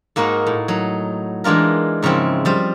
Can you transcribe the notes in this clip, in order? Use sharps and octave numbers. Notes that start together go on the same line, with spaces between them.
G#2 A#3 D#4 F#4 A#4 F5
A2
F#3 D#4
E3 G#3 D4 F4 A#4
G#2 C#3 F3 C4 E4
F3 G3 C5